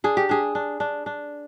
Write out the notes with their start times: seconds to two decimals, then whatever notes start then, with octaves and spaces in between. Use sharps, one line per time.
0.04 D4 G#4
0.17 G4
0.29 D4 G#4
0.55 D4
0.80 D4
1.06 D4